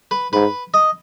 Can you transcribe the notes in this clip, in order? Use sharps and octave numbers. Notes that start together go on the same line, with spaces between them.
B4
G#2 B4
D#5